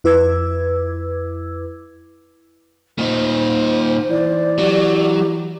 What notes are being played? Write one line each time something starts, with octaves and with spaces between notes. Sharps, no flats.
F2 E4 B4 D6 E6 G#6
A#2 D#4 C5
E3 D5
F#3 G4